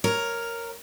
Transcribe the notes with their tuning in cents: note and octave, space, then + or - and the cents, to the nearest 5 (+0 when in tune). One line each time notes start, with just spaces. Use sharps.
A#4 +0 C#5 +0